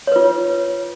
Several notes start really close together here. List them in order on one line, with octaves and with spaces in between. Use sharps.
C#5 B4 F4